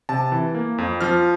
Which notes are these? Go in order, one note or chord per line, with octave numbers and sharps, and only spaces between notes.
C3 A5
E3
A#3
F2
F3 F6